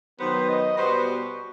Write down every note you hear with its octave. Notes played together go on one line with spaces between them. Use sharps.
D#3 F#3 B3 C5
D#5
B2 G3 B3 F#4 C5